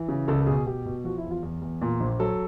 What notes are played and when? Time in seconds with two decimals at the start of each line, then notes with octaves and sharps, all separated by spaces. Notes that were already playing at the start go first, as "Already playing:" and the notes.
Already playing: E3
0.08 C#3
0.28 C#2 A4
0.41 A4
0.47 B2 G#4
0.66 B2 G4
0.85 B2
1.04 F3 F#4
1.18 E4
1.24 E2
1.31 F4
1.43 E2
1.62 E2
1.82 A#2
2.00 A#1
2.19 F#3 A4